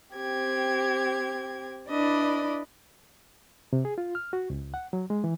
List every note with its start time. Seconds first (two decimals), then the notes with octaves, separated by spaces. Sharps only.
0.15 C4 G4 G#6
1.89 D4 E4 B4 D5 D#5
3.73 C3
3.85 G#4
3.98 F4
4.15 F6
4.33 F#4
4.50 C#2
4.74 F#5
4.93 F#3
5.10 G#3
5.24 E3